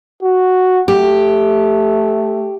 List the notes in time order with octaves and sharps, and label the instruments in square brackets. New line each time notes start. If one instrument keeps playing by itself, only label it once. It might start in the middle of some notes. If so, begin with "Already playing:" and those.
[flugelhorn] F#4
[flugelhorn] A3 [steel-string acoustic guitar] G4